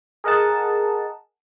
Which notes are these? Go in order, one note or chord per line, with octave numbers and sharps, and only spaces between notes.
G#4 A#4 D#5 F#5 A5